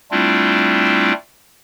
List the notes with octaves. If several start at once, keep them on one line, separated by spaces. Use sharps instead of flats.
G3 A3 C4 D4 E4 F4